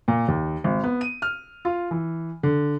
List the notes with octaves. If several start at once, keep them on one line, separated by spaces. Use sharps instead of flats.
A#2
D#2
G#1
B3
D#7
F6
F4
E3
D3